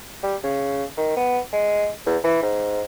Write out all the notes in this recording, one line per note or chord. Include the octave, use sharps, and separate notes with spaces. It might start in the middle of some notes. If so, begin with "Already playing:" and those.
G3
C#3
D#3
B3
G#3
E2
E3
G#2